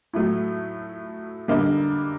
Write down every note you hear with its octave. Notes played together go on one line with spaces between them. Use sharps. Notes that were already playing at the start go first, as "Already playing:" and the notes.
A2 F#3 A3
D3 G3 A#3 D#4